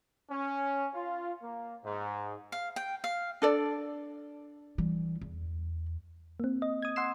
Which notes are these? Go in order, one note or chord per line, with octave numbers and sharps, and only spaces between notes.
C#4
F4
A#3
G#2
F5
G5
F5
D4 A4 D5
E3 G3
E2
A#3 C4
D#5
D#6 G#6
F#5 C6 E6 C7 E7